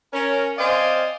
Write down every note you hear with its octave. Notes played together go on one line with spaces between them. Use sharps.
C#4 A#4
C4 C5 D5 D#5 F5 G#5